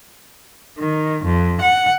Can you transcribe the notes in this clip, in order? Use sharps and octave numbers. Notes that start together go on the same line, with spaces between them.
D#3
F2
F#5